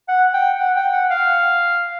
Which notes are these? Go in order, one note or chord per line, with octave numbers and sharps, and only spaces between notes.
F#5
G5
F#5
G5
F#5
F5